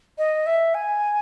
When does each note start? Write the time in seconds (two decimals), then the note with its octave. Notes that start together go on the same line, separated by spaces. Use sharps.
0.18 D#5
0.46 E5
0.74 G#5